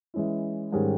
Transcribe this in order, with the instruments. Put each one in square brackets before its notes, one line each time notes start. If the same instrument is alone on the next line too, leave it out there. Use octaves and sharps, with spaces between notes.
[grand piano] E3 G#3 C#4 E4
G#2 D#3 G3 C#4 G#4